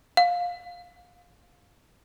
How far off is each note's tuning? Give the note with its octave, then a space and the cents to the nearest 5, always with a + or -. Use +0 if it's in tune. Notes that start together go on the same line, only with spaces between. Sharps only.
F5 +15